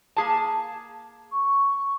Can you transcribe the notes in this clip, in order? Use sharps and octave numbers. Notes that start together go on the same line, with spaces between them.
A#3 G#4 A5
C#6